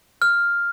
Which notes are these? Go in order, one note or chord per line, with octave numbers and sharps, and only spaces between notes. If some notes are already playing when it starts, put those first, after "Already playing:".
F6